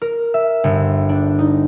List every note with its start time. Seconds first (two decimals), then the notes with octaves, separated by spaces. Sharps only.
0.02 A#4
0.34 E5
0.64 G1
1.09 D4
1.39 D#4